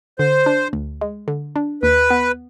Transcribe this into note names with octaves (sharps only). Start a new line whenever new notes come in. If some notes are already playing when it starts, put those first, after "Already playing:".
D3 C5
D4
D2
G#3
D3
D4
D#2 B4
B3